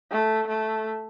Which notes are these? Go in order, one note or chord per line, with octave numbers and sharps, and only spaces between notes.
A3
A3